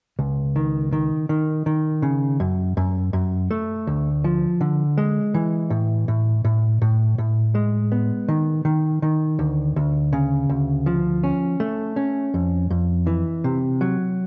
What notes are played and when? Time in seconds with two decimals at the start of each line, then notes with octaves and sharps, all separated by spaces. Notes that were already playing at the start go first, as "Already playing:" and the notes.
0.19 C#2
0.56 D#3
0.93 D#3
1.29 D#3
1.66 D#3
2.02 C#3
2.40 F#2
2.77 F#2
3.13 F#2
3.51 A3
3.87 D2
4.24 F3
4.61 D3
4.98 G#3
5.34 E3
5.70 A2
6.08 A2
6.45 A2
6.82 A2
7.18 A2
7.55 G#3
7.92 B3
8.29 D#3
8.65 D#3
9.02 D#3
9.39 D2
9.76 D2
10.13 C#3
10.49 D2
10.86 F3
11.23 C#4
11.60 A3
11.96 C#4
12.34 F2
12.70 F2
13.07 E3
13.44 C3
13.81 F#3